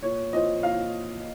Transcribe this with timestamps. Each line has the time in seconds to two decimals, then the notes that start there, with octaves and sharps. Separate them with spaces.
0.02 A#2 C#5
0.33 F3 C4 D#5
0.63 A#2 F5